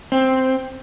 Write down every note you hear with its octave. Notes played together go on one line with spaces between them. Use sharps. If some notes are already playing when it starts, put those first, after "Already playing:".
C4